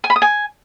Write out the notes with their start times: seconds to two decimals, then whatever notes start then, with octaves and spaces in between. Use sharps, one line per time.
0.04 G#5
0.10 B5
0.16 D#6
0.22 G#5